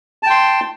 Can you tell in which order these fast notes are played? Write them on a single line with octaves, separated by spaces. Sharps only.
A5 G5 C6